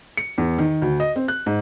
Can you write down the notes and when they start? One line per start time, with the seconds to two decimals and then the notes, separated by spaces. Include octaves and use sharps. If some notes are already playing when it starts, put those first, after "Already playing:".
0.17 C#7
0.38 E2
0.58 D#3
0.82 D2
1.00 D#5
1.16 C4
1.28 F#6
1.46 G#2